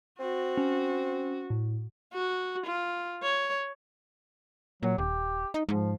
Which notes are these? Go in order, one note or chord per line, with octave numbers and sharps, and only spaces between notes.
C4 F#4
C#4
A2
F#4
F4
C#5
A#2 F#3
D#1 G4
D#4
G#2 F3